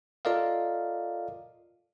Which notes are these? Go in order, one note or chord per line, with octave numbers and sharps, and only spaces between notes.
F4 A4 A#4 D5 D#5 F5